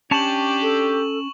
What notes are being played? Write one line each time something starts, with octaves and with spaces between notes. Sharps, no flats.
C#4 D4 G4 A5 C#6 E7 F#7
A4